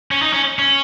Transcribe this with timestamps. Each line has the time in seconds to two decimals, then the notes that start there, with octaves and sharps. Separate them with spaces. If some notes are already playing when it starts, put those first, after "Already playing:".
0.11 C#4
0.22 D#4
0.33 C#4
0.59 C#4